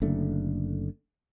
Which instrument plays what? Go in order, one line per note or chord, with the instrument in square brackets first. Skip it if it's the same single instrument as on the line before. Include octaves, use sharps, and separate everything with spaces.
[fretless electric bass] F#1 D3 A3